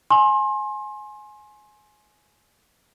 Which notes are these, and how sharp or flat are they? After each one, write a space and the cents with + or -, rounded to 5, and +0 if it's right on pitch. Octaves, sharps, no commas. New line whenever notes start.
G#5 +15 C6 +30